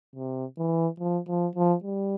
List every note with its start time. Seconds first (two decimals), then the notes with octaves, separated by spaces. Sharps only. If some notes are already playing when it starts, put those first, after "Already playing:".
0.16 C3
0.58 E3
1.00 F3
1.28 F3
1.55 F3
1.84 G3